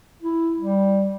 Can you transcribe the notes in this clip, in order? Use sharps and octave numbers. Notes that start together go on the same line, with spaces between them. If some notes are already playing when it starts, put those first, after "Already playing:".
E4
G3